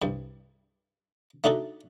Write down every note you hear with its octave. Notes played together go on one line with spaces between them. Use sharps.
C2 G2
A3 D4 D#4 F#4 A4